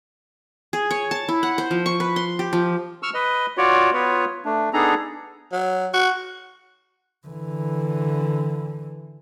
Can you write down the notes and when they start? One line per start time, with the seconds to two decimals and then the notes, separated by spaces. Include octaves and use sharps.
0.73 G#4
0.91 C#5
1.11 A5
1.28 E4
1.43 F#5
1.58 C5
1.71 F3
1.86 C#6
2.00 B4
2.16 C6
2.39 G4
2.53 F3
3.03 C#6 E6 F6
3.14 B4 D#5
3.58 F4 F#4 C#5 D5
3.93 B3 F4 B4 C#5
4.45 A3 D4
4.73 B3 D4 D#4 G#4 A4 A#5
5.53 F#3
5.94 F#4
7.27 D3 E3